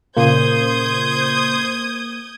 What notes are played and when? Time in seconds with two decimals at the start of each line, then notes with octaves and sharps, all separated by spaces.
0.17 A#2 C#3 A#3 C5 D#6 G6 G#6